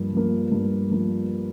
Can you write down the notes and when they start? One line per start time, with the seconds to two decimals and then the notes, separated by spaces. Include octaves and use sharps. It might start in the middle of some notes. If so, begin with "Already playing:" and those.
Already playing: G2 F3 A#3
0.13 F3 A#3
0.52 G2
0.91 F3 A#3